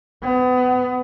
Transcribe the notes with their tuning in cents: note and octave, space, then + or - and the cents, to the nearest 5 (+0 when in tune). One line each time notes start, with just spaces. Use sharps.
B3 +30